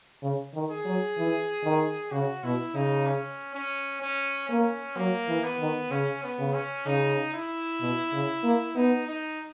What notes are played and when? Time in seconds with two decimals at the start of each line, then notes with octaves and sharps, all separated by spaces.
0.22 C#3
0.54 D#3
0.70 G#4
0.85 F#3
1.18 E3
1.64 D#3
2.12 C#3 F#4
2.44 B2 E4
2.75 C#3 D#4
3.06 C#4
3.54 C#4
4.02 C#4
4.49 A#3 C#4
4.96 F#3 A#3
5.28 E3
5.43 B3
5.59 D#3
5.91 C#3 C#4
6.23 B3
6.39 C#3
6.54 C#4
6.86 C#3 D#4
7.34 E4
7.81 B2
8.13 C#3
8.43 A#3
8.76 B3 D#4
9.07 D#4